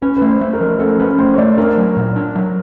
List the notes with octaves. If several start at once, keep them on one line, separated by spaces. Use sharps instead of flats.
C#4 B4
B4
A3
C5
A3
A#4
F3
C#4 A4
C#4 B4
A3 C5
C#5
A3 D5
D4 A#4
F#3
A#2
D4
F#3